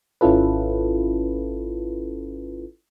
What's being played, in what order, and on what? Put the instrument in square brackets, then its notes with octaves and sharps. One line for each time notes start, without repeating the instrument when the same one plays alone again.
[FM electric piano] G#1 C#4 E4 F4 A4 B4